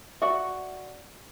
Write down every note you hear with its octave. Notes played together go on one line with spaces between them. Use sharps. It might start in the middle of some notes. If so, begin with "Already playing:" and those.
F#4 D5 E5 F#5